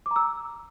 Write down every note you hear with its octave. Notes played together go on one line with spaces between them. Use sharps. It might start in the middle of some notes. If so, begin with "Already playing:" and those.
D6
A#5
E6